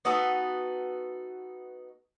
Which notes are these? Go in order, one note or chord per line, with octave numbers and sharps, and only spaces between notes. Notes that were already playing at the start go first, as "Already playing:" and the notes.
B3 D#4 F#4 A4